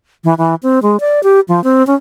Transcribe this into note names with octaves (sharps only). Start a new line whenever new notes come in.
E3
E3
C4
G#3
D5
G4
F3
C4
C#4